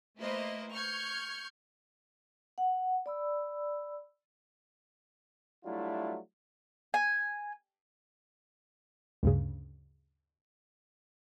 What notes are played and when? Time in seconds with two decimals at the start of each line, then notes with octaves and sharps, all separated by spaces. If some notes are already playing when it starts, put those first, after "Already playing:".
0.18 A3 A#3 E4 B4 C5 D#5
0.73 C#6 F6 G6 G#6
2.58 F#5
3.06 D5 B5 E6
5.65 F#3 G3 A3 D4 E4 F4
6.94 G#5
9.23 D2 G2 C#3